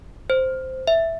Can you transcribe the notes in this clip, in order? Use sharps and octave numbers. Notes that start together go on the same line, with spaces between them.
C5
E5